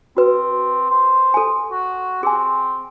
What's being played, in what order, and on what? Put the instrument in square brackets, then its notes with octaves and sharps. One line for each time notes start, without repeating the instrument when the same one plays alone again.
[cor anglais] C4 [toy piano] F#4 B4
[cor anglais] C5
[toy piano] A4 G#5
[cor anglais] F#4
[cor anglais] C4 [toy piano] G#4 G#5